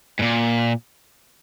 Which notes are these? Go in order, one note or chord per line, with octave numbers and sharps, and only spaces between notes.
G#2
A#2